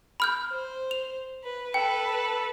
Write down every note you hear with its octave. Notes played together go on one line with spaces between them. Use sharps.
B5 F6 G6
C5
F7
B4
A4 B4 G5